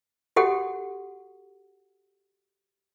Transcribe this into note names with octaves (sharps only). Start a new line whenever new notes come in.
F#4 G4 A4 F#5